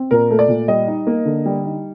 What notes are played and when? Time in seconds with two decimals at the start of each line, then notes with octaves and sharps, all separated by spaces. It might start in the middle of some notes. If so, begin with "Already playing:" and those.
Already playing: C4
0.11 A#2 A#4
0.30 A3
0.39 D5
0.48 A#2
0.68 G3 D#5
0.87 D#4
1.07 A#3
1.26 D3
1.46 G3
1.64 D#4